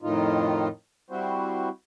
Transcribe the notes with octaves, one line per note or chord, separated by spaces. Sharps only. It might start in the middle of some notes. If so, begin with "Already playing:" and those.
F2 A2 D#3 D#4 F4
G3 C4 E4 F#4 C5